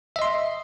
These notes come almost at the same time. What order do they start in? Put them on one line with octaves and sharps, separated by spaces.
E5 D#5 C6